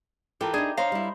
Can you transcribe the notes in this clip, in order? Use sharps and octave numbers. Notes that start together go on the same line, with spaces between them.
E3 F4 G4 A4 A#4 E5
D4 D#4 G#4
D4 C5 C#5 D#5 F5 A#5
G3 E4